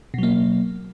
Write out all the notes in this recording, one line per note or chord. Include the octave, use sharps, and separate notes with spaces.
B2 F#3 A#3